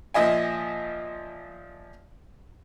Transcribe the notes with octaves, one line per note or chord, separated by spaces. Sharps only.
A#2 F3 D#5 E5 G#5